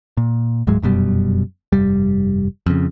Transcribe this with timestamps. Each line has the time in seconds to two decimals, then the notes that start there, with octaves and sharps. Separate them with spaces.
0.17 A#2
0.67 D1 G#2 F#3 G#3
0.82 F1 F#2 B2 G3
1.72 F1 G2 G3
2.66 F2 C#3